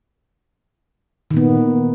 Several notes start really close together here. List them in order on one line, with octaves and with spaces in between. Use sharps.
D#3 A#2 B3